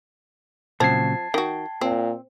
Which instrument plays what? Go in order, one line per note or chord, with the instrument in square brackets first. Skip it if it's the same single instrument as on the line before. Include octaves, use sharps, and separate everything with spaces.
[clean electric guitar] A#2 C#3 F#3 [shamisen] F3 C4 [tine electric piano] A5 G#6 C7
[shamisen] D#3 F#4 [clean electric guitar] G5
[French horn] A#2 [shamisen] C4